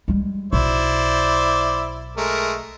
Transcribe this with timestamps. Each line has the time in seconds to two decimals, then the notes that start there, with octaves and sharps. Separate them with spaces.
0.08 G3 G#3
0.53 B1 E4 C5 D5
2.17 G#3 A3 A#4